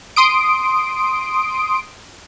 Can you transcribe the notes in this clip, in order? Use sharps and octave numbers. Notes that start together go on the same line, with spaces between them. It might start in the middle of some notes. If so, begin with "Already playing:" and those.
C6 D#6 D7